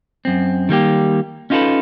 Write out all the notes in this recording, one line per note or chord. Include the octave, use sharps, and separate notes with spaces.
F#2 C4
D#3 G3 A#3 G4
C#4 D#4 F4 G#4 A4 B4